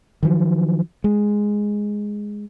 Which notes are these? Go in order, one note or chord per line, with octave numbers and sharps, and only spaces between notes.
D#3 F3 F#3
G#3